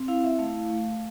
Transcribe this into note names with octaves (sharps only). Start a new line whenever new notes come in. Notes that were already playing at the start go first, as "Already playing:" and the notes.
Already playing: C4
E4 F5
E5
A3 F5
A3